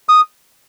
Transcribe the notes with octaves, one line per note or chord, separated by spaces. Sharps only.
D#6